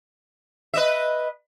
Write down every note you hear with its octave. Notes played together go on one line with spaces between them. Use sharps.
B4 D#5 E5